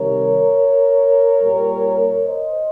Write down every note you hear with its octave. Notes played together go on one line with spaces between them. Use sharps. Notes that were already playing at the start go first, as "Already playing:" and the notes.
Already playing: C3 D#3 G3 A#4 C#5
A#2 G3
C5 D#5